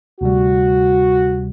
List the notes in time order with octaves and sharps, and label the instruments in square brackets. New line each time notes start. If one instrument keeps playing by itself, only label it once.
[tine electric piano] D2 C3 G3 [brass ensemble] F#4